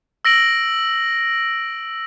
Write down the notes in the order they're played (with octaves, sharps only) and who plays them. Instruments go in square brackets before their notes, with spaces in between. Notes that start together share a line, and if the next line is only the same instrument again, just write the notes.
[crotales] E6 A#6 D7 F#7